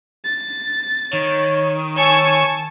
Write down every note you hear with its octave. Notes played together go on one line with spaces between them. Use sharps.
A6
D#3 C#5
C#5 G#5 A5 C#6 E6